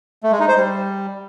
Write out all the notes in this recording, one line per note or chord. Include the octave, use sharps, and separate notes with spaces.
A3
G#3
D#4
C5
G3